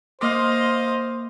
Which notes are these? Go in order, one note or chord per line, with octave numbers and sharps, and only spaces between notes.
A#3 C5 D#5 F5 C6 D6